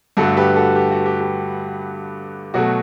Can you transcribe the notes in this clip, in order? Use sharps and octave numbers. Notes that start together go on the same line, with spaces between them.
G2 D3 A3 F#4 A4
G4 B4
F#4 A4
G4
F#4
G4
G4
B2 F#3 A3 F#4